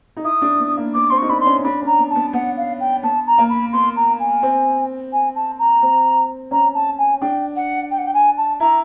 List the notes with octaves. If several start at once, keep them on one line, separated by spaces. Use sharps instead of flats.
D#4
E4 D#6
D4
B3
A#3
B3 D6
C4 C6
D#4 C#6
D4 B5
C6
C#4
D4 B5
C#4 A#5
B3
A5
B3
B3 F#5
F5
G5
B3 A5
A#5
A#3
B5
B3 C6
A#5
G#5
C4
G#5
A5
A#5
C4
C#4 A#5
A5
G#5
D4 G5
F#5
G5
F#5
G5
G#5
A5
E4 A#5